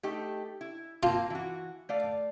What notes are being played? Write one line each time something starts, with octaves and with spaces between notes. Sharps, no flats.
A3 D#4 G4
E4
A#3 C4 F4 A5
E3 F#4
A3 D5 F5